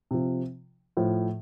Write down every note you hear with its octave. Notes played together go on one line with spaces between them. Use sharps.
C3 F3
A2 F3